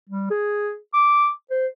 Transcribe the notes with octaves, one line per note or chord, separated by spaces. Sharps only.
G3
G#4
D6
C5